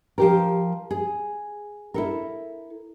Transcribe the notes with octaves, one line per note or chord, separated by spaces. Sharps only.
F3 G4 A#4
G#4
E4 A4 A#4